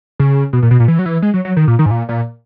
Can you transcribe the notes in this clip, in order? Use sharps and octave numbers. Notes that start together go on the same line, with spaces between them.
C#3
B2
A#2
B2
A#2
E3
F#3
E3
G#3
F#3
F#3
D#3
A#2
D#3
G#2
A#2
A#2